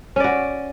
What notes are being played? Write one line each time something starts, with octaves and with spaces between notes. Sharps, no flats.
C#4 F#4 D5